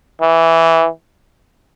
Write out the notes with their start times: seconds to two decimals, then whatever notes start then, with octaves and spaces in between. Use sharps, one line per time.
0.22 E3